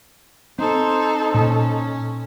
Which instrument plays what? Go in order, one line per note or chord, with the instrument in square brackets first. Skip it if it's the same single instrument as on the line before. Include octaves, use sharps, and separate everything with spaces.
[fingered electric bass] C4 [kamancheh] D#4 A4 [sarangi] C5
[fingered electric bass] A#2 [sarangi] C#4